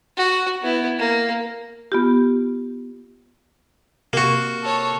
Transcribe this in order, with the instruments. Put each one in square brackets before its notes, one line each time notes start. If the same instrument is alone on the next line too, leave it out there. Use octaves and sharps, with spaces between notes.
[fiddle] F#4
B3 E4
A#3
[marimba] B3 F4 G4
[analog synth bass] C3 [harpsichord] A#3 F#4
[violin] A4 C#5